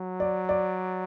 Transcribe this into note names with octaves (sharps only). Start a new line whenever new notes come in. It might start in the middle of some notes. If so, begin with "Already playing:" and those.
Already playing: F#3
D5
D5